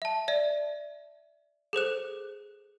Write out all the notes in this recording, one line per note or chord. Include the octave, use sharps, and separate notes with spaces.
E5 A5
D5 E5
G#4 A4 C5 F#6